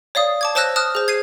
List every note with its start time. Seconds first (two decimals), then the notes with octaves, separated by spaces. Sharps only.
0.15 C#5 D5 F5 D#6
0.41 A5 D6 G#6
0.55 C5 C#5 A5 E6 F#6 A#6
0.76 A5 D#6 F6 F#6
0.95 G#4 C5
1.08 G#6 C7 D#7